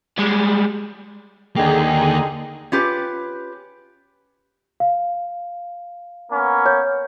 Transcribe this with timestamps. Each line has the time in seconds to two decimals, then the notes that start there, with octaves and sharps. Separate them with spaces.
0.19 G3 G#3
1.56 D#2 D3 A#3 D#4 G#4 G5
2.72 C#4 F4 G4 B4
4.80 F5
6.31 A#3 B3 C#4
6.66 C#5 G6